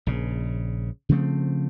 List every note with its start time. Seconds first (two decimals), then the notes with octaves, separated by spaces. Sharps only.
0.06 A#1 C#3
1.09 C#3 F3 A3 C4